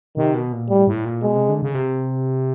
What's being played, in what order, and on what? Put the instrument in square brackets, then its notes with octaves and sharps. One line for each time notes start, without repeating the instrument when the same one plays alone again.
[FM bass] C3 [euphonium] D#3
[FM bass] B2
A#2
[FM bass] A2 [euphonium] G3
[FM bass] A2
A#2
[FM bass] B2 [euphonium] G#3
[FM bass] C3
D3
C#3
C3